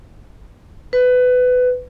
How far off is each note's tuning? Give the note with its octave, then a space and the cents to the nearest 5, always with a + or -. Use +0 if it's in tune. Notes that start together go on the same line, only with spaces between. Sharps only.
B4 +20